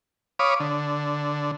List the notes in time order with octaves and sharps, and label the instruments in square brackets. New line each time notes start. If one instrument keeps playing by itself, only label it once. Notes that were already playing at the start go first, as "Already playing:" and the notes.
[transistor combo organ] C#5 F5 B5 D6 D#6
D3